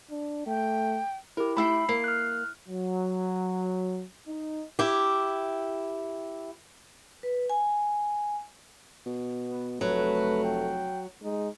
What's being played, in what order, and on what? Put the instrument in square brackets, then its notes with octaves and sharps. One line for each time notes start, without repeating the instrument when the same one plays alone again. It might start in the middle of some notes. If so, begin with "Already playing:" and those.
[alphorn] D4
[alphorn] A3 [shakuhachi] G5
[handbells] E4 G4 [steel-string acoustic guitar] A#4
[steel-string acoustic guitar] A3 E4 G5 [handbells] B5 E6 C7
[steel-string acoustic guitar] A#3 [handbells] C7
[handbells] F6 F#6
[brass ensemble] F#3
D#4
[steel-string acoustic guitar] E4 G4
[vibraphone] B4
G#5
[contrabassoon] B2
[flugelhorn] B3
[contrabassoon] F1 [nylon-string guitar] F#3 [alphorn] A3 [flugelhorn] B4
[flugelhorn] G5
[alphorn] G#3 [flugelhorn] D#4